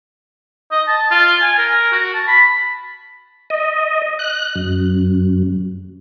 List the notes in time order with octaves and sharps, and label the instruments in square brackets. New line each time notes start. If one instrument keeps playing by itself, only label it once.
[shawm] D#5
A5
F4
G#5
A#4
F#4
A5
B5
[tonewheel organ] D#5
F#6
F#2